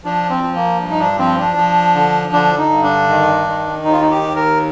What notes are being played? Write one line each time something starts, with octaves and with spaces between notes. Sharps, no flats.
F3 D4
C4
F3
A#3
G2
D#4
D4
F3 C4
D4
F3
D3
D3 D4
D#4
G2
D4
D#3
D#3
D#2 D#4
F4
D#4
G4
D#2
A#4